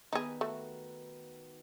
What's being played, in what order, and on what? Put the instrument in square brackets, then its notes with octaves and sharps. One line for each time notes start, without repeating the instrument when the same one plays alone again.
[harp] D#3 B3 B4 [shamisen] D#4 G#4
[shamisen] A3 [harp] F#4